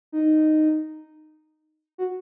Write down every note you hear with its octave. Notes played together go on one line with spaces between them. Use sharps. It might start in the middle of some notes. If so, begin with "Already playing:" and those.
D#4
F#4